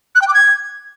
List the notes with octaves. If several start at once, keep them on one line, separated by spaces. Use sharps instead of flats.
F#6
G5
D6
G#6